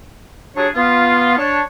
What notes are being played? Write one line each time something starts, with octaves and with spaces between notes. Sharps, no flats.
F#3 D4 G4 G#4 C#5
B3 F4
D4 C#5